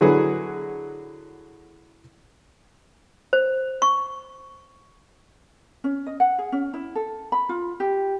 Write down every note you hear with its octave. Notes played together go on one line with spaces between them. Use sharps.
D3 F#3 E4 F#4 G#4 B4
C5
C#6
C#4
D#5
F#5
G#4
C#4
E4
A4
B5
F4
G4